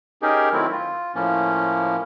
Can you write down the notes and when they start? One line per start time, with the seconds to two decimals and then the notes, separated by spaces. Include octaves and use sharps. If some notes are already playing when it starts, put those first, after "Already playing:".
0.22 C#4 D#4 G4 G#4 A#4
0.53 D#3 F#3 A3 C4 E4
0.72 F4
1.15 A2 F3 A#3 C#4